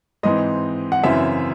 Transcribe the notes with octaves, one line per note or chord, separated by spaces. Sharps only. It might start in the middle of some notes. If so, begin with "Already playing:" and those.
G#2 E3 C4 D#5
F#5
F#2 C#3 E3 C4 E5